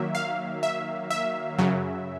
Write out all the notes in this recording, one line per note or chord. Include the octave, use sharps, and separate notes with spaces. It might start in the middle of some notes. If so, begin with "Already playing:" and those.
Already playing: D#3 F#3 A#3 E5
F5
E5
E5
F#2 C#3 F#3